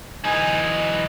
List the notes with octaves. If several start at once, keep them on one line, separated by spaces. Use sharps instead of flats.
E3 D#4 G#5